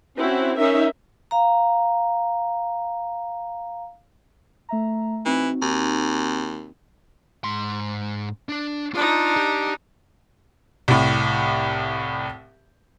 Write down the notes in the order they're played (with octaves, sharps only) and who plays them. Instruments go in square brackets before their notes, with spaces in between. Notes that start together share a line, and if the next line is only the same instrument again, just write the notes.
[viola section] C4 C#4 E4 F#4
C#4 D#4 A#4 E5
[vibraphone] F5 A#5
[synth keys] A3 E5 A#5
[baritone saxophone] E3 [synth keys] C4 D#4 F#4
[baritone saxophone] D#2
[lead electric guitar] G#2 C6
D4 D5
[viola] D4 D#4 [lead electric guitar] F4
[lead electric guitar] G4
[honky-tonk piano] C2 A2